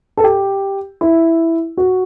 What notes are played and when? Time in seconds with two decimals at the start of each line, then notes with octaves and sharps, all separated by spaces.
0.17 A4
0.24 G4
1.01 E4
1.77 F#4